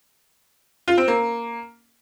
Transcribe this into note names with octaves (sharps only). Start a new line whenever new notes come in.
F4
C4
A#3